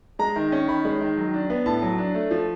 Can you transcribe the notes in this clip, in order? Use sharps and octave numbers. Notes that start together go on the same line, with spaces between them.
G#3 A#5
D#3
C#4
D#3 B5
G#3
D#3
F#3
D4
B3
A2 A5
F#3
D4
A3
F3